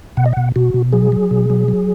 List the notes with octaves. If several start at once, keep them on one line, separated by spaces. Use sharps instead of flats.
B2 F#5
D#5
B2 F#5
B2 F#4
B2
F#3 G#4
F#3
B2
F#3
F#3